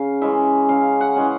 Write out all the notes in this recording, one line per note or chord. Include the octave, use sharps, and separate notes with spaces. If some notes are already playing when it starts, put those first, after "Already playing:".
Already playing: C#3 F5
E3 G#3 C#4 E5
C#3 F5
F#5
E3 G#3 C#4